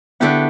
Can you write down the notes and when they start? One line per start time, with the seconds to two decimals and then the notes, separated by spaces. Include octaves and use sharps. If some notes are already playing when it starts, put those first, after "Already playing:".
0.20 D3 A3 B3 E4 G4 B4